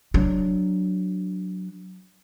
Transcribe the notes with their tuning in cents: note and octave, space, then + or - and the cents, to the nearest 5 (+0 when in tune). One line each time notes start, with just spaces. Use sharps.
F#3 +0 D4 +0